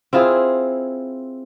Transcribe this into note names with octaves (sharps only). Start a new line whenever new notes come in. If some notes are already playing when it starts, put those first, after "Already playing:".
C4 E4 F4 G#4